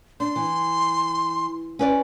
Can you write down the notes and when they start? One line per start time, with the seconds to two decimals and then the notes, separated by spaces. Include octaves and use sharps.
0.20 D4 C6
0.36 E3
1.79 C#4 B4 D5